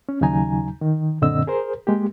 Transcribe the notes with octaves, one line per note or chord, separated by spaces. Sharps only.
C#4
D#2 C#3 F#3 D#4 G#5 A#5
D#3
F#2 A#2 D3 C4 D#5 E6
G#4 A#4 C5
G#3 A#3 G4